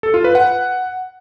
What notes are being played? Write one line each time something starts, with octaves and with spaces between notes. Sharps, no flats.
A4
F4
B4
F#5